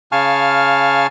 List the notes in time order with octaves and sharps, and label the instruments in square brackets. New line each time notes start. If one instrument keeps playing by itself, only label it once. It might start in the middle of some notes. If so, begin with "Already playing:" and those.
[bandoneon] C#3 F5 G#5 A5 C#6 F6